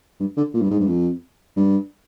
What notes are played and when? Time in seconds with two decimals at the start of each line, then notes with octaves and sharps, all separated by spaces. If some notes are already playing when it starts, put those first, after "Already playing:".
0.20 G2
0.37 D3
0.54 A#2
0.62 G2
0.70 G#2
0.80 G2
0.87 F2
1.56 G2